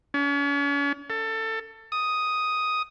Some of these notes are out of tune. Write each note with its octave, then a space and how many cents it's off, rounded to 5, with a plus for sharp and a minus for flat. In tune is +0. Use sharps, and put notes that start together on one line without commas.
C#4 +40
A4 +20
D#6 +5